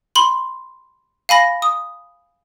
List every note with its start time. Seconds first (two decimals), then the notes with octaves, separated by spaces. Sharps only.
0.15 B5 C6 F#7
1.29 F5 G#5 B5 A#6
1.62 D#6